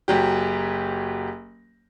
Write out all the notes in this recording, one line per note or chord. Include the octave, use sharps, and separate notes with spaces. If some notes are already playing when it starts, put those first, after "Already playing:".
F#1 F#3 G4